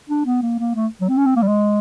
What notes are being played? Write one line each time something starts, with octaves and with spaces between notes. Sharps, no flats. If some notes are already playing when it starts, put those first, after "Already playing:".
D4
B3
A#3
A#3
A3
F#3
C4
C#4
C4
A#3
G3
G#3